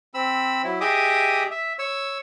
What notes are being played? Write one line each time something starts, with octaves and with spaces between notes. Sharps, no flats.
C4 B5 E6
F#3 E4
G4 G#4 D#5 E5 D6 D#6
E5
C#5 E6